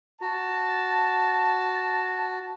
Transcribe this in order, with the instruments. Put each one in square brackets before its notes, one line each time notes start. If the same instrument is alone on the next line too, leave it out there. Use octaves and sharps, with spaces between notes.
[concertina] F#4 [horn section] A5